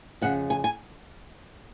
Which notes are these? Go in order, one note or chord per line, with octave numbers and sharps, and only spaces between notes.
F2 C#3 F#5
G#5
G#5